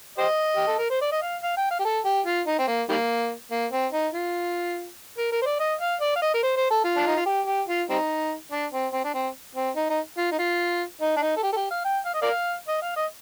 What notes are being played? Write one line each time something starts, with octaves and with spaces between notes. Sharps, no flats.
G4 C5 D#5
G4
A4
A#4
C5
D5
D#5
F5
F5
G5
F5
G4
A4
G4
F4
D#4
C4
A#3
D#3 G3 A#3
A#3
C4
D#4
F4
A#4
A#4
C5
D5
D#5
F5
D5
F5
D#5
A#4
C5
C5
A4
F4
D4
D#4
F4
G4
G4
F4
G3 C4 D#4
D4
C4
C4
D4
C4
C4
D#4
D#4
F4
D#4
F4
D#4
D4
D#4
A4
G4
A4
G4
F5
G5
F5
D#5
A#4 D5 F5
D#5
F5
D#5